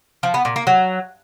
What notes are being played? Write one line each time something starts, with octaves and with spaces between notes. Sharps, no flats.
F3
B3
A#2
A#3
F#3